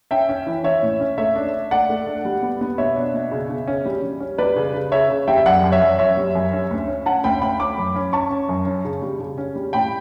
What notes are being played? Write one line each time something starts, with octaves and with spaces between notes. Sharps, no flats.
C#4 E5 G5
C#4
E3
C#4 C#5 E5
A2
C#4
A3 C#5 E5
D4
D4
A3 D5 F#5
A3
D4
G3
B3
B3
B2 C#5 E5
D4
B2
C#3
C#3
C#4
G3
G3
C#4
G3 B4 D5
C#3
C#3
C#3 C#5 E5
C#3
G3 E5 G5
E5
F#2 D5 F#5
F#2
C#5 E5
F#2
F#2 C#5 E5
G3
F#2
C#4
D2
C#4
C#4 F#5 A5
D2 G5 B5
D2 G5 B5
C#4 B5 D6
F#2
C#4
C#4 A5 C#6
C#4
F#2
C#4
C#3
G3
C#3
C#4
G3
A2 G5 B5